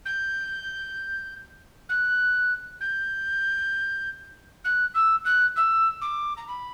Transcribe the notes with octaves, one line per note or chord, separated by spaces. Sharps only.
G6
F#6
G6
F#6
E6
F#6
E6
D6
A#5
B5